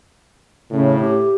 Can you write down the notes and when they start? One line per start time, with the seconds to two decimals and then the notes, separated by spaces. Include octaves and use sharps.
0.71 A2 C#3
1.00 G4